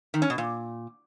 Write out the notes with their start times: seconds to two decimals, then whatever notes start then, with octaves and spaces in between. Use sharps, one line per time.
0.14 D#3
0.22 C#4
0.30 B2
0.38 A#2